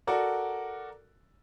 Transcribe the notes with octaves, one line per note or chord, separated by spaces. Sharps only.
F#4 A4 A#4 D5